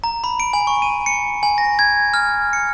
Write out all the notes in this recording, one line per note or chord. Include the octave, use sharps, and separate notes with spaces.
A#5
B5
D7
G#5
C#6
D#7
C#7
G#5
A#6
G#6
F6
C#7